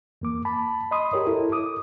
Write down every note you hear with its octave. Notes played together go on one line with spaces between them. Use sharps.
E2 A#3 D6
A5 B5
D#5 B5 C6 D#6
G4 G#4 A#4 C#5 D#5
E4 A4 A#4
D6 D#6